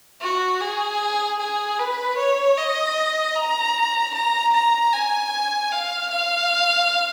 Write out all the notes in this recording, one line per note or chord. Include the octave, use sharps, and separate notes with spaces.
F#4
G#4
G#4
B4
C#5
D#5
A#5
A#5
A#5
G#5
F5
F5